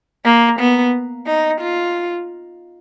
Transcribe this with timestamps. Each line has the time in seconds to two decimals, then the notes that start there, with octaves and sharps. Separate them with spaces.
0.25 A#3
0.59 B3
1.27 D#4
1.60 F4